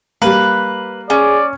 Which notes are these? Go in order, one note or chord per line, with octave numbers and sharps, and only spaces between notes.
G3 A#3 B4
C#4 G#4 D5